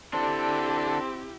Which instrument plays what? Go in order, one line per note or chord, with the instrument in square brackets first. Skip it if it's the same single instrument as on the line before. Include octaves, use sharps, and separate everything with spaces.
[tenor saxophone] C4 [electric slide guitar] D4 A4 [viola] E4 G4 [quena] A5